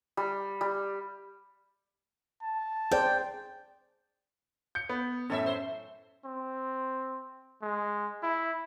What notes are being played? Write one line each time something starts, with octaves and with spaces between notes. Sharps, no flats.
G3
G3
A5
G#4 C5 D5 G5
G6 C#7
B3
F#2 A2 C#4 A4 C#5 E5
C5
C4
G#3
E4